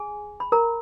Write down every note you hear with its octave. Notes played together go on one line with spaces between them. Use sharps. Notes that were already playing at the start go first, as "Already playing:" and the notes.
Already playing: G#4 G#5
B5
A#4 A#5